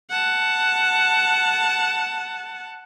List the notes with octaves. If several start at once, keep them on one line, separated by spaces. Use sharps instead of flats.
F#5 A5